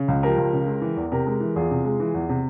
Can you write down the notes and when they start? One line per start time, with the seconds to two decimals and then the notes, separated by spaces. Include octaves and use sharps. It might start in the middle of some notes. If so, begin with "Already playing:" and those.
Already playing: C#3
0.08 C#2
0.23 F3 G4 A#4
0.38 C#2
0.53 C#3
0.67 G#3
0.81 E3
0.97 E2
1.12 C3 G4 A#4
1.26 G#3
1.40 E3
1.56 E2 F4 G#4
1.71 C3
1.85 G#3
2.00 E3
2.14 E2
2.29 C3